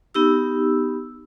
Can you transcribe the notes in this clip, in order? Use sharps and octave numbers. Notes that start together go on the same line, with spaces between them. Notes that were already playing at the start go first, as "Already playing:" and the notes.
B3 D#4 G4 E6